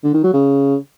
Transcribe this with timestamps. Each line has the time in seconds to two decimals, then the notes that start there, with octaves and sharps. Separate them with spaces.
0.04 D3
0.14 D#3
0.24 F#3
0.34 C#3